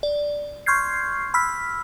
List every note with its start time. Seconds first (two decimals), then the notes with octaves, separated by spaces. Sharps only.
0.03 D5
0.66 C6 C#6 F6 G6 G#6 C7
1.34 B5 E6 F6 B6